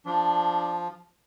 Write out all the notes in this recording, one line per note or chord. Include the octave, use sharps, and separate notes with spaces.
F3 D4